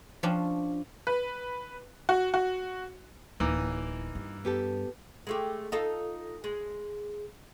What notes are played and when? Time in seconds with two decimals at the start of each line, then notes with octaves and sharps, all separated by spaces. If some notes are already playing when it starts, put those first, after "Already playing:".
0.23 F3 C#4 D4 F4
1.07 B4
2.09 F#4
2.34 F#4
3.40 D1 E3 A#3 D#4 D6
4.15 G2
4.45 B3 G4 A4
5.27 G#3 A3 G4
5.72 D#4 F4 A4
6.44 G#3